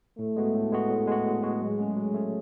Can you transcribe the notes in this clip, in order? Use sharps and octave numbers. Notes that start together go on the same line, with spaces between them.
A2 A3
G#3 B3 F#4
A2
G#3 B3 F#4
A2
G#3 B3 F#4
A2
G#3 B3 F#4
F#3 G#3
A3 C#4 G#4
F#3
A3 C#4 G#4